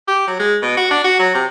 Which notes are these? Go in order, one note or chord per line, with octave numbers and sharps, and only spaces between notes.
G4
F#3
G#3
B2
F#4
D4
F#4
F#3
C3